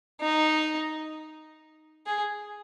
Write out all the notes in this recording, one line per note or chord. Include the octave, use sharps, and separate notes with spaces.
D#4
G#4